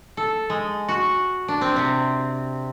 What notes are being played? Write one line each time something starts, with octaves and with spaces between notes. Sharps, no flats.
A4
G#3
F#4
D4
C4
C3